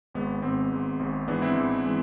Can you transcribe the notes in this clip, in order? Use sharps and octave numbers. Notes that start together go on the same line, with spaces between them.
G#1 G#2 G#3 B3
G#1 G#2 G#3 C4
G#1 G#2 G#3
G#1 G#2 G#3
G#2 E3 G#3 B3 D4
C4 E4
G#2 E3 G#3
E3 G#3